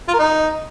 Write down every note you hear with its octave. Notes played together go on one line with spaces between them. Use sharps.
F4
A#4
D#4